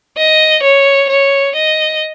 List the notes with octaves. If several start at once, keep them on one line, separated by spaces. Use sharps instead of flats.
D#5
C#5
C#5
D#5